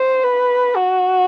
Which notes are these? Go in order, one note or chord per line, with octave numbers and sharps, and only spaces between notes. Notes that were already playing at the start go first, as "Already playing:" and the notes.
Already playing: C5
B4
F#4